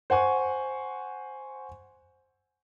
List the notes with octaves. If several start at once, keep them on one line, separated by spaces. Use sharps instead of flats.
C5 F#5 G#5 C#6